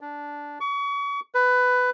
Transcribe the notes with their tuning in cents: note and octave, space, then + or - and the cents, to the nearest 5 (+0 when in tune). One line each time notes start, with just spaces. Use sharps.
D4 -10
C#6 +35
B4 +15